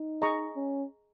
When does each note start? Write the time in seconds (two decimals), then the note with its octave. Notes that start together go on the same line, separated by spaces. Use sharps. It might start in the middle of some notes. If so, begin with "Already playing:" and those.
Already playing: D#4
0.22 G#4 D#5 A#5 C#6
0.56 C#4